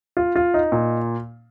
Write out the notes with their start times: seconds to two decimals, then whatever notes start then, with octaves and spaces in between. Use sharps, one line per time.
0.17 F4
0.36 F4
0.54 D#4
0.72 A#2